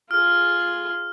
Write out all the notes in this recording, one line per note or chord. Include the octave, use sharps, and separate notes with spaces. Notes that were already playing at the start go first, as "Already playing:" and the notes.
F4 G#4 F6